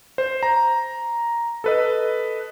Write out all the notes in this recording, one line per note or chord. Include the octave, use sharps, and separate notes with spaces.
C5
A#5
A4 B4 D#5